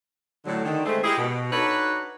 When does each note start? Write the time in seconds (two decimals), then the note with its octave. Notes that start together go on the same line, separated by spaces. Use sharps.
0.45 A2 D3 F#3
0.64 D3 D#3
0.86 G#3 A3 C4
1.03 G#3 E4 G4 G#4
1.17 B2
1.52 D4 D#4 F#4 A4 B4 C#5